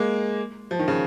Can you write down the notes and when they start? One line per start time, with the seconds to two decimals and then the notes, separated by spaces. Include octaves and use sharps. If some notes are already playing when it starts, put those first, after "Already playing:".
Already playing: G#3 A#3
0.71 F3
0.79 D#3
0.88 C#3